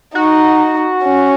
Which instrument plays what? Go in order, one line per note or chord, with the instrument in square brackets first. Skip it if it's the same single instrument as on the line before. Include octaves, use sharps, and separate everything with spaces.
[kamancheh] D#4 [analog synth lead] F#4
[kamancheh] C#4